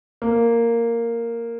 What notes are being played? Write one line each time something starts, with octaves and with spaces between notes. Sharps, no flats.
A#3